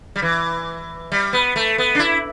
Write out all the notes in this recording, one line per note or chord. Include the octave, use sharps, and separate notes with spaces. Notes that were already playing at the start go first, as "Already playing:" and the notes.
G3
E3
G3
B3
A3
B3
D4
E4